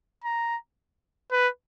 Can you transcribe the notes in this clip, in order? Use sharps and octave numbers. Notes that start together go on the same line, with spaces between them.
A#5
B4